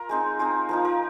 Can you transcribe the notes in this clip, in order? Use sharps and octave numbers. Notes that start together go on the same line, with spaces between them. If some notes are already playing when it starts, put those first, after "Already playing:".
Already playing: F4 A#4
G#3 C4 D#4
G#3 C4 D#4
F3 C4 D#4 A#4
A#4